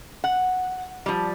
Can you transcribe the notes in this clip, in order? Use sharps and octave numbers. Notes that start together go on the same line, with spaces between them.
F#5
F3 G3